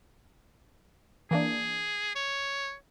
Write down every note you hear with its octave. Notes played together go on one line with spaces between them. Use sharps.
E3 A#3 D4 G#4
C#5